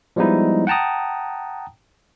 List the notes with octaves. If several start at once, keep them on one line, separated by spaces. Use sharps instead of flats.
F3 G3 G#3 B3 D#4 E4
F#5 G5 A5 A#5 D#6